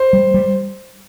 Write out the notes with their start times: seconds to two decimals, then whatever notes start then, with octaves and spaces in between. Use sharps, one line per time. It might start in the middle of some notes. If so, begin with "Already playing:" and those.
Already playing: C5
0.13 G3
0.34 G3